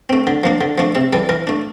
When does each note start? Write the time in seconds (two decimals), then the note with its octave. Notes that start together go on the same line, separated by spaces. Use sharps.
0.09 A3 C4
0.27 D3
0.44 F3 A#3 D4
0.61 D3
0.78 F3 A3 D4
0.95 C3 E5
1.13 E3 G3 A4
1.29 E3 A#4
1.47 A3 D4